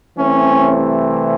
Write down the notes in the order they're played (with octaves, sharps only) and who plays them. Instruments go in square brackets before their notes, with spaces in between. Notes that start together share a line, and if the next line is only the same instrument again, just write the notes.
[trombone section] C2 C3 E3 A3 C4 C#4